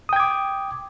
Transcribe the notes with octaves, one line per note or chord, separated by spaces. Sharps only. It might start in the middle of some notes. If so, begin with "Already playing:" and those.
G5 D6 D#6 G#6